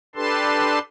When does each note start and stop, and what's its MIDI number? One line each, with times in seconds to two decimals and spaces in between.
0.16 0.79 62
0.16 0.79 67
0.16 0.79 69
0.16 0.79 71
0.16 0.79 81
0.16 0.79 84